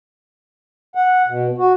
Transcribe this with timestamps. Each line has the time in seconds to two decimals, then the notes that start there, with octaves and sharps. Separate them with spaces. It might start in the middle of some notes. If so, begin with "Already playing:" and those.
0.95 F#5
1.28 B2
1.58 F#4